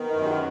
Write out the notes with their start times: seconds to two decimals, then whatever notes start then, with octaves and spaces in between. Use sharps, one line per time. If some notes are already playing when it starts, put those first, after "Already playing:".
Already playing: D#3 B3
0.10 D#4
0.16 F#2
0.26 F#4